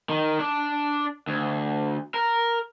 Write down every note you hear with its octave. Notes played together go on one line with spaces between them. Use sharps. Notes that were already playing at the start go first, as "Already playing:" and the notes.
D#3
D4
D2
A#4